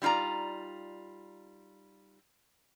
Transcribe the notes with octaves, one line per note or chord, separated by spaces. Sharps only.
G3 D#4 F4 D5 A#5